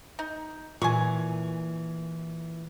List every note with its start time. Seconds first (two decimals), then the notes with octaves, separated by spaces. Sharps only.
0.19 D#4
0.82 A#2 E3 G#5 C#6